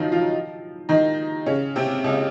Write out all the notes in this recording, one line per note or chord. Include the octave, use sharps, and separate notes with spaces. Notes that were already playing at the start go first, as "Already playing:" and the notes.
Already playing: D#3 F3 F#3 D#4 F4
F3 F4
D#3 D#4
C#3 C#4
C3 C4
C#2 C#3